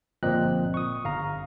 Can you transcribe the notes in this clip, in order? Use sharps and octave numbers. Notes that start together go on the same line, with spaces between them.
G1 A#2 F3 C4 D#5 F#6
C#6 D#6
G1 F5 A#5